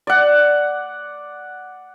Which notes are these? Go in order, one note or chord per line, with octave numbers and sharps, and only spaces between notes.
D5 F#5